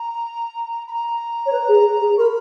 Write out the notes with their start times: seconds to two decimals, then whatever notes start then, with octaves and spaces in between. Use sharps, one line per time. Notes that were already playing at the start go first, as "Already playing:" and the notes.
Already playing: A#5
0.87 B5
0.90 A#5
1.46 C#5
1.52 B4
1.68 G#4
2.01 G#4
2.17 A#4 C#6
2.21 B5